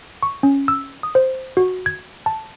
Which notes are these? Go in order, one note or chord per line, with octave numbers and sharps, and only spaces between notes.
C#6
C#4
E6
D#6
C5
F#4
G#6
A5